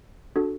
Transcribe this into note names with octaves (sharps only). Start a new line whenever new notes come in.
D4 F#4 A4